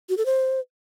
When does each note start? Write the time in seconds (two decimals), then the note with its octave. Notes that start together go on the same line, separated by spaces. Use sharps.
0.09 F#4
0.17 A4
0.26 C5